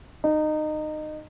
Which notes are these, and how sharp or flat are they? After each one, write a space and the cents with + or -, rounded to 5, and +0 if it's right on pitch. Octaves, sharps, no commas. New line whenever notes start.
D#4 -20